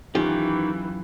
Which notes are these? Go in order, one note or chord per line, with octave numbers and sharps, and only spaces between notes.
F#2 D#3 E3 F4 G4